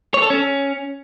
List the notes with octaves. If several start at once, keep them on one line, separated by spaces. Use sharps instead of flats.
C#5
A4
C#4